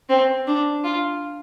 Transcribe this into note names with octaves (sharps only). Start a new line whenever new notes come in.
C4
D4
F4